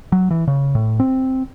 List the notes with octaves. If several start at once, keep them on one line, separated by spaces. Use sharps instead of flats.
F#3
E3
C#3
A2
C4